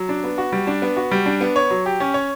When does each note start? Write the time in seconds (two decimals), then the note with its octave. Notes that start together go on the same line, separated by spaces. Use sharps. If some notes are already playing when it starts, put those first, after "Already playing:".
Already playing: F#3
0.09 D4
0.24 B3
0.38 F#4
0.52 G3
0.67 D4
0.82 B3
0.97 F#4
1.11 G3
1.26 D4
1.41 B3
1.56 C#5
1.70 F#3
1.86 G4
2.00 C#4
2.14 C#5